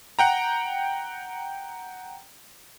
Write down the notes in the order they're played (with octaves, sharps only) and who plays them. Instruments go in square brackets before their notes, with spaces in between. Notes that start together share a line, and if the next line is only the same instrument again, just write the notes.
[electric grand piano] F#5 G5 A#5